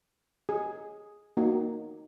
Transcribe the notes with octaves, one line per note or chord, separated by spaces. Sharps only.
G#4
A#3 D#4 F#4